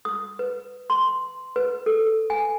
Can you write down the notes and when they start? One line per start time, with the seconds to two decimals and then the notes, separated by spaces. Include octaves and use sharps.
0.05 D#6
0.39 B4
0.90 C6
1.56 B4
1.86 A4
2.30 G#5